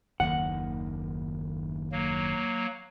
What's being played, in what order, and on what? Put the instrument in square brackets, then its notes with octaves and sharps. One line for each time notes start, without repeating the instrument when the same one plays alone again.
[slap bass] F#1 D#2 D#3 [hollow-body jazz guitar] F#5
[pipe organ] F#3 A#3